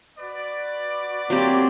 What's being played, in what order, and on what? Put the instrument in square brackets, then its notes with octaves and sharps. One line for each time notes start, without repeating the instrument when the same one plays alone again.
[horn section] F#4 B4 D5
[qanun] F#3 A#3 G4 [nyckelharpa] C4